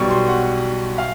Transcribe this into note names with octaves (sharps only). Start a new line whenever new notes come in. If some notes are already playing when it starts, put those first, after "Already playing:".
Already playing: B1 B2 G3 C#6
C6
F#5
F5